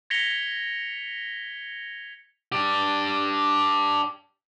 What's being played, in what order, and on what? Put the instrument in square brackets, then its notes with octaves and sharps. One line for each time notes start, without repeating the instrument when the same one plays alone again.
[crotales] G#6 A#6 B6 C#7 F7 G7
[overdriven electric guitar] D4 G4